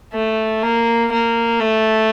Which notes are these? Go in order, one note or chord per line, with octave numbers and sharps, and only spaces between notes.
A3
A#3
A#3
A3